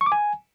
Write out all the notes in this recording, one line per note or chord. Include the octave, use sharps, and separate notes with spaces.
C#6
D6
G#5